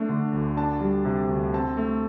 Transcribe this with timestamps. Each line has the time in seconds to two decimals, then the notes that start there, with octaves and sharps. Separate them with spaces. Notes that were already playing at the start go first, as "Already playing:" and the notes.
Already playing: A3 D4
0.09 D3
0.33 D2
0.57 D4 A5
0.81 G3
1.05 C3
1.29 D2
1.54 C4 A5
1.77 A3